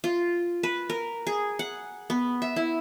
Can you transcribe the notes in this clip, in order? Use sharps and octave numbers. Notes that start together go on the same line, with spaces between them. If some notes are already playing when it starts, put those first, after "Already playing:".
F4
B4
A#4
G#4
F#5
B3
E5
E4